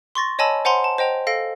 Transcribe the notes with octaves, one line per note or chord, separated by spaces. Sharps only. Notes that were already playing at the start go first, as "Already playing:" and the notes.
C6 C#6 A6 A#6
C#5 D#5 G#5 A5 B5 E6
C5 F#5 G#5 A#5 C6
A5
C5 D#5 G5 F7
A4 F5 A#6 D7